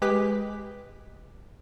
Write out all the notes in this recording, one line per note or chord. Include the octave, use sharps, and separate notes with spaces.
G#3 G4 G#4 B4 B6